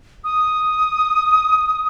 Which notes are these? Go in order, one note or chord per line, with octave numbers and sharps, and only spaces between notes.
D#6